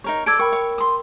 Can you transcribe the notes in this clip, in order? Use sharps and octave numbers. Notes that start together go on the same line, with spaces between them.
D#4 A#4 C#5
A4 D5 E6 G#6 D7
A#4 G5 B5 C#6
C#5 C#6
C6 D#6